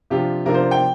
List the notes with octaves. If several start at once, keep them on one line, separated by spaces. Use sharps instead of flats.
C3 F3 D4 F4 G4
C3 F3 D4 F4 A#4
C5
G5